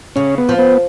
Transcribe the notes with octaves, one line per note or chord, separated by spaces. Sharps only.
C#3 C#4
B3
F3
B3